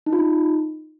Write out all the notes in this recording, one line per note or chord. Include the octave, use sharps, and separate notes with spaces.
D#4
F4
D#4